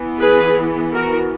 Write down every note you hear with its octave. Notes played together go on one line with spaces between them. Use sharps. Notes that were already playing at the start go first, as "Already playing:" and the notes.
Already playing: E3 B3
G#4 B4
F#4 A#4